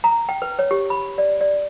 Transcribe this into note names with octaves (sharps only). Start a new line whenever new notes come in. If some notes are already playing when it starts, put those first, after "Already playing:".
A#5
G5
B4
C#5
G4
B5
D5
D5